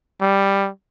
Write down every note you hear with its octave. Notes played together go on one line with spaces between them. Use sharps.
G3